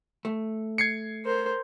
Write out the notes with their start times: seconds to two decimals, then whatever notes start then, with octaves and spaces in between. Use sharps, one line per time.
0.25 A3
0.78 G#6 C7 C#7
1.25 A#4 C5